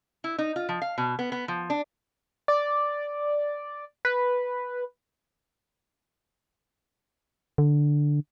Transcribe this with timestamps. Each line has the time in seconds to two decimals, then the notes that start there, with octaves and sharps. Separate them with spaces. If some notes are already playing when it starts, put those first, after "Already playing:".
0.24 E4
0.38 D#4
0.56 F4
0.69 F3
0.82 F5
0.98 B2
1.19 B3
1.32 B3
1.48 F3
1.70 D4
2.48 D5
4.05 B4
7.58 D3